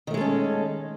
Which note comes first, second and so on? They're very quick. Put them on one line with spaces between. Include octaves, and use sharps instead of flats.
D#3 A3 G#3 A4 C#4